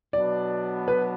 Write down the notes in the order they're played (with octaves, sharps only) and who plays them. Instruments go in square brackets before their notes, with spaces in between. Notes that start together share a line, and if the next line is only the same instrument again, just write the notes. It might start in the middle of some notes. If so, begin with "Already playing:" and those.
[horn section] B2 F#3 B3 D4 [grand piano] D5
[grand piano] B4